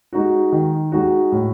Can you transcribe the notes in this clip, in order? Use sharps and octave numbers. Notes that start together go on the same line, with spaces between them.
G#3 D#4 F#4
D#3
G#3 D#4 F#4
A2